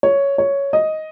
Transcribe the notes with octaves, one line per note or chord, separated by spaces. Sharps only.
C#5
C#5
D#5